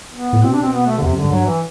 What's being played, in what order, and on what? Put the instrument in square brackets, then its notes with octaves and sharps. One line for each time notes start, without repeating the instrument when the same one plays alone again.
[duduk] B3
[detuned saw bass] A2
[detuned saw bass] B2 [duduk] C4
[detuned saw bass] C3 [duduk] D4
[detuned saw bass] B2 [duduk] C4
[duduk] B3
A3
D3
[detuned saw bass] E2 [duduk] C3
[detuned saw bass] F#2
[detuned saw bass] G2 [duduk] D3
[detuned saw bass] G2 [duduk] F#3
[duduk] E3